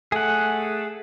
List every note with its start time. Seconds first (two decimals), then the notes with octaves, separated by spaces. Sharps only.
0.12 A3 G#4 F#5